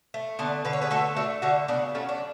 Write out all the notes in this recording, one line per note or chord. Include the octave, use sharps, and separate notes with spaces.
A3
D3 B3 D4
D3 B4
C#5
G#4 B4
A3 F#4 A4
A3 D4 F#4
D3 D4 F#4
C#3 B3 D4
F#3 A3 C#4
D4